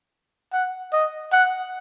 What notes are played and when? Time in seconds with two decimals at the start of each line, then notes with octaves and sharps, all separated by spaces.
0.53 F#5
0.93 D#5
1.32 F#5